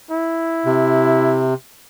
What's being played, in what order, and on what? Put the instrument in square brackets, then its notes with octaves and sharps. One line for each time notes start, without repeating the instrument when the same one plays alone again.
[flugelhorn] E4
[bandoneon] C3